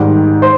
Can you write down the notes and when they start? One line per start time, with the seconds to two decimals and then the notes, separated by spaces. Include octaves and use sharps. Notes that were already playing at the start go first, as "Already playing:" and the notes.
Already playing: G#2 D#3 G3
0.42 C5 C6